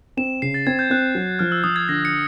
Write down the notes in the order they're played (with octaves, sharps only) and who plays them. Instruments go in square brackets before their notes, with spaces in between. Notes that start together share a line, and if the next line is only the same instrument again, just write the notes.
[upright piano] C4 [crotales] E7
[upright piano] C#3 [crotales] C7
[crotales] A6
[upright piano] C4 [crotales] G#6
[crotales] G6
[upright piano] C4 [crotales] F#6
[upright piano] F#3
[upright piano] F3 [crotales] F6
[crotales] E6
[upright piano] F3 [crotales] D#6
[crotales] G#6
[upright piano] D3 [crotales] A#6
[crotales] C#7